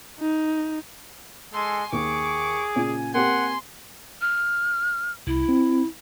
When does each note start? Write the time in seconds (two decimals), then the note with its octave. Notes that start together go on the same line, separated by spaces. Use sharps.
0.20 D#4
1.53 G#3 A4 G#5 C6
1.93 D#2 G#4 C#6 D6
2.76 A#2 C#3 G#5
3.14 A#3 C4 G4 F#5 G#5 C6
4.21 F6
5.27 C2 E4
5.49 C4